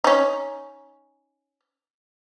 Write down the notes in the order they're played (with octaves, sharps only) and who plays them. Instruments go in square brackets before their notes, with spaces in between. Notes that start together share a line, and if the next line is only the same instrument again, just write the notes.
[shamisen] C#4 D#4